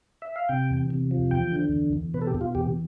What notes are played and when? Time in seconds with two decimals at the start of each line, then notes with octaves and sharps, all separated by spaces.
0.22 E5
0.36 F5
0.49 C3 G5
0.70 E2
0.90 C3
1.11 F3
1.31 E2 G5
1.52 D3
1.72 E2
1.93 E2
2.14 B2 B4
2.21 A4
2.27 G4
2.34 B2
2.41 F4
2.55 E2 G4